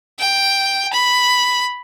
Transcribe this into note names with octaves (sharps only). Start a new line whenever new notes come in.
G5
B5